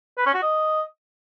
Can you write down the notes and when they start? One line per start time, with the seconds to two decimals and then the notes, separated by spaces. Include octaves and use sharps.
0.18 B4
0.26 C#4
0.34 F#4
0.42 D#5